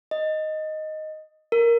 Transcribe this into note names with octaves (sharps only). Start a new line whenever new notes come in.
D#5
A#4